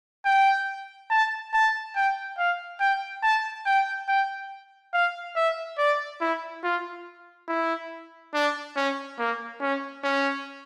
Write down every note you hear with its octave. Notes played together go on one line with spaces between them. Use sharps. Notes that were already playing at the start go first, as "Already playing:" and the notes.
G5
A5
A5
G5
F5
G5
A5
G5
G5
F5
E5
D5
E4
F4
E4
D4
C#4
A#3
C#4
C#4